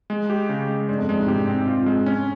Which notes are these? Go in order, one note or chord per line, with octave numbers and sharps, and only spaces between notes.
G#3
G4
C#3
G#3
G2 G#3
F2
G2 G#3
G#2
C3 G4
C4
F4
G#3
C#4